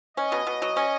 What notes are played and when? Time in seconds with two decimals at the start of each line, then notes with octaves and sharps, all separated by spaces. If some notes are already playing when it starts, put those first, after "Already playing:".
0.17 C#4 D#5
0.32 B2
0.47 B2
0.62 F#3
0.77 C#4